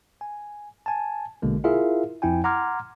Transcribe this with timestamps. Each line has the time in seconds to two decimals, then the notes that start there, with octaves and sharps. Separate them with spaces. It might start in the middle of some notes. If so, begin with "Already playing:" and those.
0.21 G#5
0.86 G#5 A5
1.42 A#1 B2 D3 G#3 A#3
1.64 E4 F4 G#4 A#4 E5 F5
2.22 F2 F3 E4 G5 G#5
2.44 F#5 A#5 C6 D6 F6 G#6